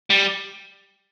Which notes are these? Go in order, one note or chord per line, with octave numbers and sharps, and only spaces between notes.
G3